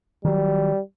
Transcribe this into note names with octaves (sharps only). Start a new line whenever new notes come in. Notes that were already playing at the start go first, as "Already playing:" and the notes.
D#3 F#3 G3